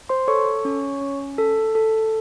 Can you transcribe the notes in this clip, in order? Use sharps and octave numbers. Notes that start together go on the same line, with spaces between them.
C5 C6
A4 C#5 C#6
C#4
C#4
A4
A4